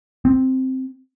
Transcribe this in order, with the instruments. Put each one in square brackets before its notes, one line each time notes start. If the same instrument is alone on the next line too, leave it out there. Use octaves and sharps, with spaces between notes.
[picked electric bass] C4